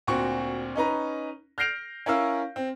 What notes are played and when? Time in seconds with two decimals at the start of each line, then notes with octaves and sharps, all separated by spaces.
0.07 D2 A#2 C4 F#4 C#6
0.75 C#4 D#4 B4 A#5
1.58 F6 G6 A#6 C7 D7 F7
2.06 C#4 E4 A#4 F5 E6
2.56 C4